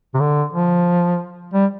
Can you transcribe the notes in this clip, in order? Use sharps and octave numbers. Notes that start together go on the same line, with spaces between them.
C3
D3
F3
G3